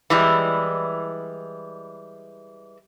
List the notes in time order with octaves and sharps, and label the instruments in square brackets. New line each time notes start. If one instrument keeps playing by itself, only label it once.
[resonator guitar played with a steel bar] E3 G3 G#3